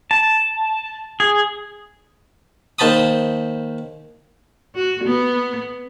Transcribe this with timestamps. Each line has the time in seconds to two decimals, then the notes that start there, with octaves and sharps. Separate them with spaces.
0.11 A5
1.20 G#4
2.79 D#2 C5 A5 B5 D#6
4.75 F#4
5.04 B3